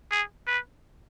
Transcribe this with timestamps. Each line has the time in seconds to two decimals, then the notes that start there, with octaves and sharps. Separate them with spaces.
0.11 G#4
0.47 B4